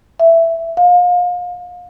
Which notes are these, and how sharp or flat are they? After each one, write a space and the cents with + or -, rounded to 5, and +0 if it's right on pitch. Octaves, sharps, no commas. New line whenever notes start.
E5 +10
F5 +35